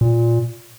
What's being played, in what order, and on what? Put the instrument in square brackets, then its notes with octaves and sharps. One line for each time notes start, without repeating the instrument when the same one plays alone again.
[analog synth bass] A#2